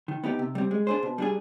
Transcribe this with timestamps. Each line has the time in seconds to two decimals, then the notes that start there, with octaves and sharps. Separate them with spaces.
0.08 D#3
0.24 B3 D#4 G4
0.39 C3
0.55 G3 C4
0.71 G#3
0.87 D4 G#4 C5
1.03 B2
1.18 G3 D4 G#4